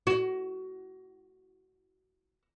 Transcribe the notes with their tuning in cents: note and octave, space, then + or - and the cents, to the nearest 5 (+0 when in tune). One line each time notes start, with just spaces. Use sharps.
F#4 +20